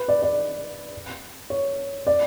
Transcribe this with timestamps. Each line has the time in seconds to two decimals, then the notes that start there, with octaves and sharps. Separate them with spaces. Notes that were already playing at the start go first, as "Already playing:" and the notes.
Already playing: B4
0.08 D5
0.22 D5
1.50 C#5
2.07 D5